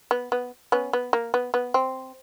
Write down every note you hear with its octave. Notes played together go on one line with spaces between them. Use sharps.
B3
B3
B3 C#4
B3
A#3
B3
B3
C4